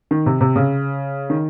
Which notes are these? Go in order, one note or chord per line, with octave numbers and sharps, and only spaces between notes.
D#3
C3
C3
C#3
D#3